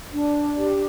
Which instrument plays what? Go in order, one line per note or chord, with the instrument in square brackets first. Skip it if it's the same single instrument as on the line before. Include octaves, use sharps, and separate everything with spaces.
[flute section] D4
G4